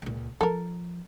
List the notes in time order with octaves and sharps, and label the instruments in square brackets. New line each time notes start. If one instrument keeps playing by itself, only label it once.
[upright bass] C#2 A#2
[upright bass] F3 [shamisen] A4 A#4